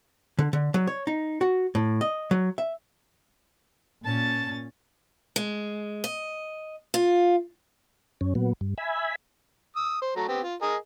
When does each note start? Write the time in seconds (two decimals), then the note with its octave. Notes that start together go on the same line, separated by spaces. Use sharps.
0.39 D3
0.53 D3
0.74 F#3
0.87 C#5
1.07 D#4
1.41 F#4
1.75 A2
2.01 D#5
2.31 F#3
2.58 E5
4.05 A#2 C#4 A5 A6
5.36 G#3
6.04 D#5
6.94 F4
8.21 F#2 C#4
8.35 A#2 F#3 B3
8.61 G2
8.78 E5 G#5 B5
9.76 D#6 E6
10.02 C5
10.16 F#3 A3 A#5
10.28 B3 C4 G4
10.43 F4
10.62 G#4 A#4 D#5